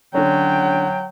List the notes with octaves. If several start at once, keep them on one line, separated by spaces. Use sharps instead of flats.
D3 F#3 C#4 G5